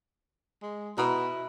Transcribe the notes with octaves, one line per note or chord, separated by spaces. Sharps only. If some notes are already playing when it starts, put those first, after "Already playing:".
G#3
B2 E4 B4 A#5